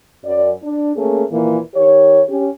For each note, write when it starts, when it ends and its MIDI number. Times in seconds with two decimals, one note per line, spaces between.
0.24 0.50 42
0.24 0.50 74
0.61 0.91 62
0.96 1.24 57
0.96 1.24 58
0.96 1.24 61
0.96 1.24 68
1.31 1.58 46
1.31 1.58 51
1.31 1.58 52
1.31 1.58 58
1.74 2.21 51
1.74 2.21 67
1.74 2.21 73
2.27 2.47 61
2.27 2.47 67